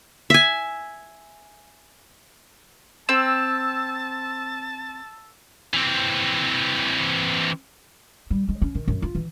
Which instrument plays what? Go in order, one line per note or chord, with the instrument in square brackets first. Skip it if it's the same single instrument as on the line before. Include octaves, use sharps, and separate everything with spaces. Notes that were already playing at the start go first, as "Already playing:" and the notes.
[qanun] E5 G#5
[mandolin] C4 [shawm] A5 [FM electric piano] E6
[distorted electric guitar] E3 C4
[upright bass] G3
G#3
C#4
D#3
F#2
F4
E3